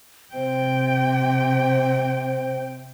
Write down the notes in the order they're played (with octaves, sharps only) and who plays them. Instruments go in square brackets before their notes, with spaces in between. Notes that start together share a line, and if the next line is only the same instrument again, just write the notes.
[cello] C3 G5 [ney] C5